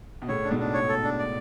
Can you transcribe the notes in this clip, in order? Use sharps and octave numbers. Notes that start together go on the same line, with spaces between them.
B2
A2 C#3 C#5
D4
G#2 B2
D4
C#5
A4
D4
D5